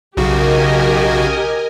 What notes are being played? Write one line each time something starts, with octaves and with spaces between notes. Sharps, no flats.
B1 C#3 F#4 G4 A#4 D#5 G#5